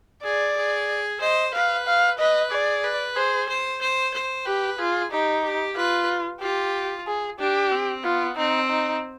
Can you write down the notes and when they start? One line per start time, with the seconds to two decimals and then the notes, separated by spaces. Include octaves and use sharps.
0.24 G#4 D5
0.57 G#4
1.21 C5 D#5
1.54 B4 F5
1.87 F5
2.19 B4 D#5
2.51 G#4 D5
2.84 B4
3.16 G#4 C5
3.49 C5
3.82 C5
4.14 C5
4.46 G4 B4
4.79 F4 G#4
5.12 D#4 G4
5.44 G4
5.77 F4 B4
6.42 F4 G4
7.07 G#4
7.39 D4 G4
7.72 C4
8.04 B3 F4
8.37 C4 D#4
8.70 D#4